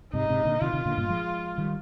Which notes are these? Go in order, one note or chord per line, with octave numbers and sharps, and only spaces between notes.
G#2 C3 D#4
G#2 C3
A#2 D3
C3 D#3 F4
C3 D#3
A#2 D3
G2 A#2
F3 G#3
D#3 G3